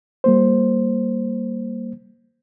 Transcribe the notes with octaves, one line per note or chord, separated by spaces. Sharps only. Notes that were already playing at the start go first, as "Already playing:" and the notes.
G3 A#3 C5